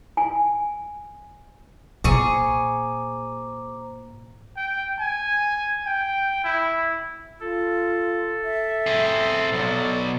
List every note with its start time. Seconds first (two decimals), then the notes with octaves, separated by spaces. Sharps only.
0.17 G#5
2.04 A#2 G#4 C5 A#5 C#6 D6
4.56 G5
5.00 G#5
5.86 G5
6.44 E4
7.40 F4 A4
8.43 E5
8.86 C4 G#4
9.52 B1 B2 D5